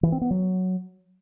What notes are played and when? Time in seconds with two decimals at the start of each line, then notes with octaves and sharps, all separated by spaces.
0.03 E3
0.12 C4
0.21 B3
0.31 F#3